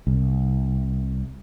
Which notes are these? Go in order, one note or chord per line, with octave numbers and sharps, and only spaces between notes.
C2